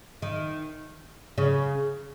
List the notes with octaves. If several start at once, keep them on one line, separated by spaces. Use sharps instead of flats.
D#3
C#3